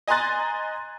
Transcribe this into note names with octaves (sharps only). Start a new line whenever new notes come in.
D#5 G#5 A#5 C6 F#6 A6